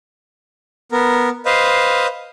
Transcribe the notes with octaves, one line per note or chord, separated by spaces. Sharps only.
B3 A#4
B4 C5 D#5 F5